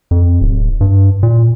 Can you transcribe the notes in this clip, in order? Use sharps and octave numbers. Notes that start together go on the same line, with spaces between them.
F2
D1
G2
A#2